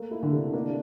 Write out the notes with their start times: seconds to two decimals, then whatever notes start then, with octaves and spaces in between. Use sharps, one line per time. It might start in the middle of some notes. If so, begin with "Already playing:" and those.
Already playing: A3 A#3
0.11 E4
0.23 D3
0.33 C3
0.53 A#3 D4